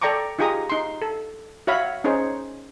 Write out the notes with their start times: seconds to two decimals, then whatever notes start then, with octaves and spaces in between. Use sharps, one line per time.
0.02 A4 D5 G5 A#5 C#6 D6
0.39 D#4 F4 G4 G#4 A#5 D#6
0.70 D#4 C6
1.02 A4
1.67 F#4 C#5 E5 F5 B5
2.04 C#4 D#4 G#4 C5 C#5